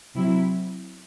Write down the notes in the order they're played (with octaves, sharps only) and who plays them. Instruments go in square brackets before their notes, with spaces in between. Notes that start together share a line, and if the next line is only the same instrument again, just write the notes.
[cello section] C3 F#3 C4 E4